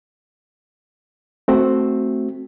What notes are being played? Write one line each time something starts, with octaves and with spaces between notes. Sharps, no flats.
A3 C4 F#4